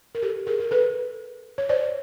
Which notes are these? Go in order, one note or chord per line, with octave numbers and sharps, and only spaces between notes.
A#4
G4 A4
G#4 A#4
A#4
A4 B4
C#5
C5 D5